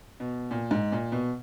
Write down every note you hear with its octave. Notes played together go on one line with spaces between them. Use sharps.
B2
A#2
G#2
A#2
B2